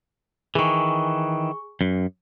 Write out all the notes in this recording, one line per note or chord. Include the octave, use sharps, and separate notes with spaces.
D#3 E3 G#4 C#6
F#2